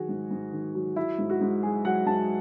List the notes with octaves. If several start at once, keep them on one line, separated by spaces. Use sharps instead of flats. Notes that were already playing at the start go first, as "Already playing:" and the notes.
Already playing: D#3 F#3 F#4 G#4
G#2
G#2
D#3
F#3
F#3 E4
G#2
F#4
G#2
F#3 G#4
F#3 F#5
G#2 A5